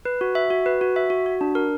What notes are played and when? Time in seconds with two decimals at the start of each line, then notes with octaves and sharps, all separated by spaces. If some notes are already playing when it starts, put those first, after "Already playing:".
0.05 B4
0.21 F#4
0.35 E5
0.50 F#4
0.66 B4
0.81 F#4
0.96 E5
1.10 F#4
1.26 F#4
1.41 D4
1.55 A#4